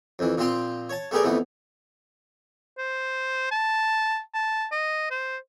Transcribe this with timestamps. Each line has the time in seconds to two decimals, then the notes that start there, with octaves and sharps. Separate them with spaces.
0.19 F2 E3
0.38 A#2 F3 C4 F4 G5 C6
0.89 C#5 A5
1.11 A3 B3 G4 G#4 A#4 D5
1.24 F2 E3 A3 B3
2.78 C5
3.51 A5
4.34 A5
4.72 D#5
5.11 C5